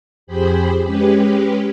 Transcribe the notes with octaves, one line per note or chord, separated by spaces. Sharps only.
F2 G4 G#4 C5 B5
G#3 C#4 G4 B4